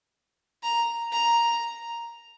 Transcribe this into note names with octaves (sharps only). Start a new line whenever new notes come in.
A#5
A#5